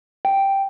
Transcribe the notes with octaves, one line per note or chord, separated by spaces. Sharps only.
G5